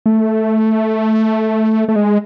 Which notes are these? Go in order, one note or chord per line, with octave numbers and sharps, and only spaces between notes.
A3
A3
G#3